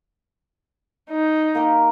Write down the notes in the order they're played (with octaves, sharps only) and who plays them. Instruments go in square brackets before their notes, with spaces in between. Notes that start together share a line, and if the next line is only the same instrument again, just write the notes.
[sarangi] D#4
[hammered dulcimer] A#3 G4 A#4